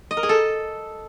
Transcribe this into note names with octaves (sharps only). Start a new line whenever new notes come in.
D#5
A#4
G#4
A4